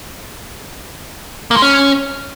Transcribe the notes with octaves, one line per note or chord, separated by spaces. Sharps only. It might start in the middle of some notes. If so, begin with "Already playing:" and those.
A#3
G#3
C#4